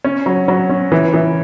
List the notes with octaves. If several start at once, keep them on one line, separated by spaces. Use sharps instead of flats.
C#4
F#3
F#3
C#4
E3
E3